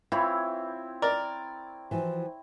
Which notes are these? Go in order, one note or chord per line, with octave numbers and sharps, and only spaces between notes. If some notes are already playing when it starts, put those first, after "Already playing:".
E3 C4 E4 F4 C#5
A#4 D5
E3 F3 F#4